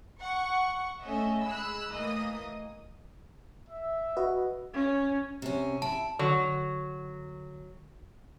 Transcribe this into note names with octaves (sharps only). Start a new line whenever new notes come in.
F#5 C#6
A3 C#4 D#5 E5
G#3 B5 E6 F#6
A2 E3 A#3 D#5 D#6
E5
F#4 B4 D#5
C#4
C3 C#4
E4 A5
D3 F#3